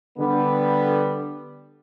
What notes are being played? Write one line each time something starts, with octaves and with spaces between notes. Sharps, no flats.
D3 G3 B3